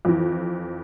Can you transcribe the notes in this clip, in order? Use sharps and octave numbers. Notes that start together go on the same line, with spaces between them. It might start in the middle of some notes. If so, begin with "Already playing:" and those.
F2 E3